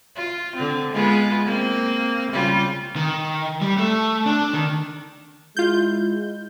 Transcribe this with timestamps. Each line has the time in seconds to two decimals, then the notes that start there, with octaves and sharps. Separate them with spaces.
0.16 F4
0.56 D3 C4
0.93 G#3 B3 F4
1.46 A#3 C4
2.32 C#3 G3 F4
2.96 D#3
3.62 G3
3.78 A3
4.26 D4
4.53 D#3
5.57 G#3 E4 F4 G6